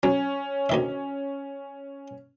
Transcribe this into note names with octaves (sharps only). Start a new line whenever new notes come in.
F#3 C#4
D2 D#3 E5